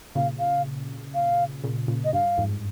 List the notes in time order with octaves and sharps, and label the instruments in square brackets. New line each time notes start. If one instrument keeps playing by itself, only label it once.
[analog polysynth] A#2 C#3 [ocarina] F5
[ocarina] F5
F5
[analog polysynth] A#2 C#3
A#2 C#3
[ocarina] D#5
[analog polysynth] G2 [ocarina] F5
[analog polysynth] F2 G#2